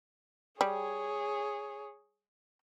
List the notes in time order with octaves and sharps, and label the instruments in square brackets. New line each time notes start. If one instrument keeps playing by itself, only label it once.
[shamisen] G3 [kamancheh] G#4 C#5